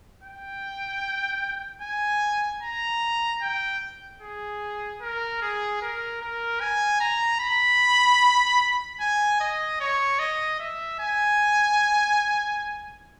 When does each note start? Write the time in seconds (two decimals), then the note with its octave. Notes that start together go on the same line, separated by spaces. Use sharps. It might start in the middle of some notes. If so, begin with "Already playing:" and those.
0.23 G5
1.82 G#5
2.63 A#5
3.42 G5
4.21 G#4
5.01 A#4
5.42 G#4
5.82 A#4
6.21 A#4
6.60 G#5
7.00 A#5
7.40 B5
9.00 G#5
9.40 D#5
9.80 C#5
10.19 D#5
10.60 E5
11.00 G#5